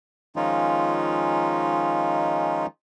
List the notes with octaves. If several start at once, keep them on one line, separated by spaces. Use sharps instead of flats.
D#3 F3 G#3 C#4 D#4 F4